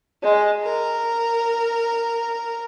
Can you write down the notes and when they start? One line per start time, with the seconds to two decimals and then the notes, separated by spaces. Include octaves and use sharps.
0.23 G#3
0.63 A#4